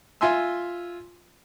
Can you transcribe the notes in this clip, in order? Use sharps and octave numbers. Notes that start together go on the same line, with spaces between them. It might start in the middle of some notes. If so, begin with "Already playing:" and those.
F4 E5 G#5 C6 E6